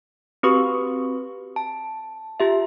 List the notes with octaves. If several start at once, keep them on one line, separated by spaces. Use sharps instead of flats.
C4 F#4 G4 B4 C#6 D#6
A5
F4 G4 E5